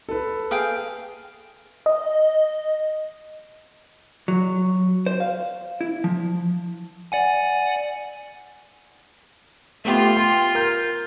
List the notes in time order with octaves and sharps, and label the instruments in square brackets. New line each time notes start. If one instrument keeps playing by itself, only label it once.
[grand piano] A4 B4
[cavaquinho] G#4 F5 G5
[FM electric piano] D#5
[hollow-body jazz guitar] F#3
C5
F5
E4
F3
[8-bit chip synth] D5 F#5 G#5
[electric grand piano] A3 B3 G4 [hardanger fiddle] F4
[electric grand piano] G5 C6
A#4 F6 G6